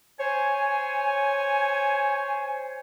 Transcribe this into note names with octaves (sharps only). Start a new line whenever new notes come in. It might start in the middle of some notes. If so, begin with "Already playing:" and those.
C5 C#5 G#5